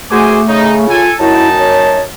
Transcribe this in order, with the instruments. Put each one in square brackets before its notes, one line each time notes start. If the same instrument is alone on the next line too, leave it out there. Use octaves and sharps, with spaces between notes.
[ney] A3 [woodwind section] F#4 G#4 D6 [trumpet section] A#4 C5 G#5
[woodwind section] C#3 [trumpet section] D#4
[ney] F4 [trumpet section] A4 G#5
[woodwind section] F#2 [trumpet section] D#4 A5 [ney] E4
[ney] C#5